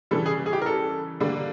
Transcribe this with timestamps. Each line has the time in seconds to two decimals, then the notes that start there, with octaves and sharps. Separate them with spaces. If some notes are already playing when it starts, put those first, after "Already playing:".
0.11 C#3 E3 G3 A4
0.26 G#4
0.46 G#4
0.53 G4
0.62 A#4
0.66 A4
1.20 D3 G3 A#3